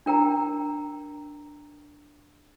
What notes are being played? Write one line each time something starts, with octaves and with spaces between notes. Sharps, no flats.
D4 A#4 G5 A#5